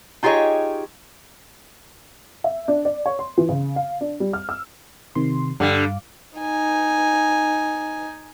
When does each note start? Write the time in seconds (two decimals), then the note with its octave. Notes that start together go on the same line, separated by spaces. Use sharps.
0.23 D#4 F4 G4 G#4 C#5 D#5
2.44 E5
2.68 D4
2.85 D5
3.06 C#5
3.19 C6
3.38 E3
3.49 C#3
3.76 F5
4.01 D4
4.20 G3
4.33 F6
4.49 E6
5.15 C3 D#3 C6
5.60 G2 D3 G3 F5 D6
6.38 D#4 G#5